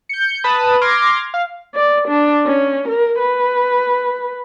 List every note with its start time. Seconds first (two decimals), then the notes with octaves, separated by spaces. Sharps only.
0.09 G6 C#7
0.44 B4 A5 B5 D#6
0.81 C6 D6 F6 G#6 A#6
1.34 F5
1.75 D5
2.08 D4
2.45 C#4
2.89 A#4
3.19 B4